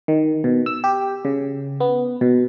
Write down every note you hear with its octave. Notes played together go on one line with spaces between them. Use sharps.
D#3
B2
E6
G4
C#3
B3
B2